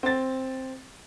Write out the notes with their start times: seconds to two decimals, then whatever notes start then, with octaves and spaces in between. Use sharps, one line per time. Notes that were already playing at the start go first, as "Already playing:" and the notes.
0.03 C4 A6